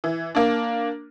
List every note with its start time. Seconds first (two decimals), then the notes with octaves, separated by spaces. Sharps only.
0.04 E3
0.35 A#3 D4